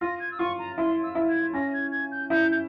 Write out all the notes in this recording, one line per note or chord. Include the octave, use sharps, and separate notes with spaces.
F4 A#6
G#6
E6
F4 C#6
A#5
E4 C6
E6
E4
G#6
C#4 A#6
G#6
G#6
G6
E4 G6
G6